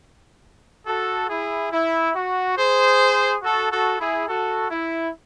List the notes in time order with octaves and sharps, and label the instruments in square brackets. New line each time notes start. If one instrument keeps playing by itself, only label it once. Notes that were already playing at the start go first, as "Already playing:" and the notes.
[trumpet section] F#4 A4
E4 G#4
E4
F#4
G#4 C5
F#4 A4
F#4 A4
E4 G#4
F#4 A4
E4